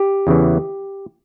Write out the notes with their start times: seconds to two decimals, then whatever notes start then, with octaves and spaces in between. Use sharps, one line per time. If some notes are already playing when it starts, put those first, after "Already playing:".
Already playing: G4
0.27 E2 C#3 E3